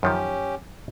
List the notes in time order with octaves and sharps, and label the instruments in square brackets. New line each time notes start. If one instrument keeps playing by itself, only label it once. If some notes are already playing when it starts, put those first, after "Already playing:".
[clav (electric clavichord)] F#2 D#3 F3 [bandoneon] C#4 G4